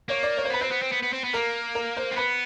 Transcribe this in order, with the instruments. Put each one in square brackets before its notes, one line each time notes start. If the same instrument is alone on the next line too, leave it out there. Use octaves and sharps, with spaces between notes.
[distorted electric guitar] A#3 [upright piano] C#5
[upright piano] D5
C#5
C5
[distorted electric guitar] B3 [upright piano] B4
[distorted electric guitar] C4 [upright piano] C5
[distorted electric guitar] B3
C4
B3
B3
C4
B3
[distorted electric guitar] A#3 [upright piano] A#4
[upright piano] A#4
C5
[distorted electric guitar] C4
[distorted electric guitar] B3 [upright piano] B4